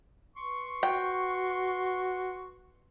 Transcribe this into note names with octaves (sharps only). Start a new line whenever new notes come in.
B4 C6 C#6
F#4 G5